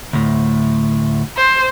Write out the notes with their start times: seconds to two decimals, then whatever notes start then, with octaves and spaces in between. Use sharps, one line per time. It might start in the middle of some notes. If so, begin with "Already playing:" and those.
0.13 D2 A2
1.37 C5